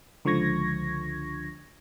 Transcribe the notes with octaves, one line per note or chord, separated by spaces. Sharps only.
C#2 D3 F3 C#6 G#6 A#6